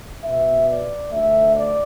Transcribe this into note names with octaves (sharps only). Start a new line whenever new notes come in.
B2 B3 E5
D5
D2 D3 A3 E5
D5